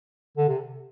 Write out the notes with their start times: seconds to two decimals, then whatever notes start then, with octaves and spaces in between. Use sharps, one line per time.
0.37 D3
0.48 C3